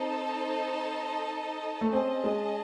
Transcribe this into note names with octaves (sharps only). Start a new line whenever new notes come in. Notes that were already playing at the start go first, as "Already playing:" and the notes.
Already playing: C4 D#4 A4 C5 D#5 A5
A3
C4 C#4 G#4 D#5 A5
G#3